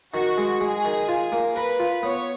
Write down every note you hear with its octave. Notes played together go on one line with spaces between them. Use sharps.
D#3 F#4
G#3
G#3 G#4
D#3
F4
A#3
A#4 B4
F4
B3 C#5